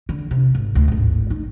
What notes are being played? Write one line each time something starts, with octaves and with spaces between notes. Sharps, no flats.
D3
C3
G#1
D2
G#1 A2
D#4